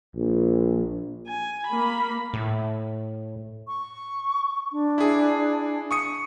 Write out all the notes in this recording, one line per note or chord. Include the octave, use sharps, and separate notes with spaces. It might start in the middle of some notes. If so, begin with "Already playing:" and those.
A#1
G#5
A#3 B5
A2
C#6
D4
E4 G#4
C#6 D#6 C#7